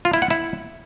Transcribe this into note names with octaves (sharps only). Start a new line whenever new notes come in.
F4
E4
F#5
E4